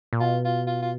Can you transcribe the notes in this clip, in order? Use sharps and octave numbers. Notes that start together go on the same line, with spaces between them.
A#2
B2 F4
F4
F4
F4